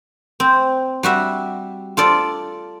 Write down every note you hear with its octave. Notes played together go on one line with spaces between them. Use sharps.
C4
G3 F#4 E5
F4 A4 D5